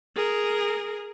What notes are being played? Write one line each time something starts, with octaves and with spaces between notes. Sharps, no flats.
G#4 A#4